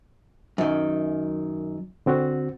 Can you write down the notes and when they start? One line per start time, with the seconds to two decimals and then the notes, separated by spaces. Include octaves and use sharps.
0.58 F#2 D#3
2.06 D3 C4 F#4